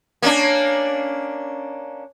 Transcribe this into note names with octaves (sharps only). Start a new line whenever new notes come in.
A#3 C#4 D4